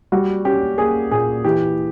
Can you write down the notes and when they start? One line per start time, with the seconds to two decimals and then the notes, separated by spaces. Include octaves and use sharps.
0.12 G3 F#4
0.45 C#4 G4
0.78 A#3 G#4
1.11 A#2 G#4
1.44 E3 G4